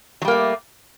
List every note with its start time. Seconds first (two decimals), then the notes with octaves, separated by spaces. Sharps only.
0.22 F#3
0.25 G3
0.28 A#3
0.31 A3